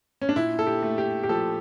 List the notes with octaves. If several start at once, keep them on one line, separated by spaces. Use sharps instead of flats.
C#4
D4
A#2 E4
A4
G4
A3
G4
G4
F3 A4